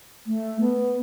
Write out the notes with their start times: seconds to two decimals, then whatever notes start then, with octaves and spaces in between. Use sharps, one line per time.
0.26 A3
0.60 B3